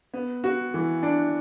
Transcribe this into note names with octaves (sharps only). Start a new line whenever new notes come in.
B3
F#4
E3
D4